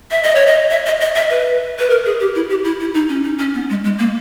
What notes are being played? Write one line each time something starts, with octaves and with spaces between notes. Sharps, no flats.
E5
D#5
C#5
D#5
E5
D#5
D#5
E5
B4
B4
A#4
G#4
G4
E4
G4
E4
E4
D#4
C#4
D#4
C#4
B3
G#3
G#3
A#3